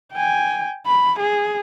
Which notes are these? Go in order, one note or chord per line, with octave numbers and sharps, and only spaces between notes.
G5 G#5
B5
G#4